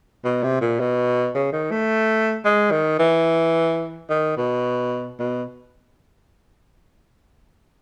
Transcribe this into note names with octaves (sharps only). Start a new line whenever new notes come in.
B2
C3
A#2
B2
C#3
D#3
A3
G#3
D#3
E3
D#3
B2
B2